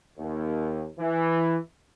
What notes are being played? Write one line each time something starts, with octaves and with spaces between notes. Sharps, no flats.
D#2
E3